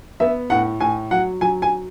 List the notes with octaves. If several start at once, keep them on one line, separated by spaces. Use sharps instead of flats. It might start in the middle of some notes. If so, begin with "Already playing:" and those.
B3 E5
A2 F#5
A2 G#5
F#3 F#5
F#3 G#5
G#5